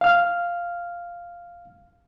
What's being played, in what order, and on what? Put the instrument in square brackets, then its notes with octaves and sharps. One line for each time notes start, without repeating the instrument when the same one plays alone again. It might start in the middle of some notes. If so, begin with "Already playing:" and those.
[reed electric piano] F5 F6